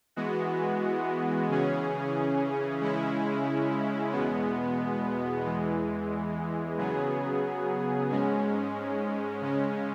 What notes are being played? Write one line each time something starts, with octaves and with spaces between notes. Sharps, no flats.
E3 G#3 B3 F#4
C#3 E3 C#4 G#4
C#3 G#3 C#4 E4
E2 B2 G#3 B3
E2 E3 G#3
C#3 F#3 B3 G#4
G#2 G#3 C#4
C#3 G#3 C#4